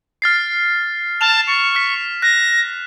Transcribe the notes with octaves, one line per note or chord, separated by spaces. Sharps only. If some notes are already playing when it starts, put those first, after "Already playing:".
F6 A6 C7
A5 F6 E7 F7
C#6
F6 B6
F#6 A#6